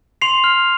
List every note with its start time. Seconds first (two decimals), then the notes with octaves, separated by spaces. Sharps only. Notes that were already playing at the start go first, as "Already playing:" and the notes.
0.22 C6 C7 F7
0.44 F6